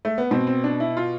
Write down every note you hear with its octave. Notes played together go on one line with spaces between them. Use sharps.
A3
B3
B2 C4
C4
D4
E4
F4